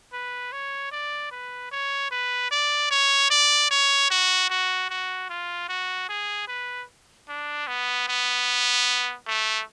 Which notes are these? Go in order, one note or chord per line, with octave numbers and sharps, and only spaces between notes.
B4
C#5
D5
B4
C#5
B4
D5
C#5
D5
C#5
F#4
F#4
F#4
F4
F#4
G#4
B4
D4
B3
B3
A3